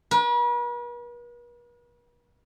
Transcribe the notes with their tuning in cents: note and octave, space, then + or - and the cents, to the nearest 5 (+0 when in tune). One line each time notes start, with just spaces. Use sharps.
B4 -45